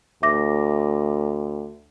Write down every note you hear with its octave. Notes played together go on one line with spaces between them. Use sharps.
D2 E5 D6 A#6